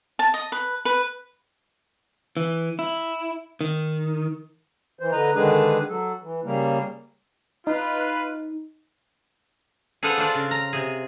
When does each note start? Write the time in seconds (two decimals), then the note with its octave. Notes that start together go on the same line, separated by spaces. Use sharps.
0.19 A5
0.34 D#5
0.52 B4
0.85 B4
2.37 E3
2.79 E4
3.61 D#3
4.99 E3 C5
5.12 D3 B4 D#5 A#5
5.35 D3 D#3 G#3 D4 G#4 B4
5.89 F#3 A4
6.22 E3
6.44 C#3 G3 A#3
7.67 D#4 F4 B4
10.03 G#4 A4 B4 C5 F5 F#5
10.17 D4 F4 C5 D5
10.35 C#3
10.51 A#5
10.73 C3 G#4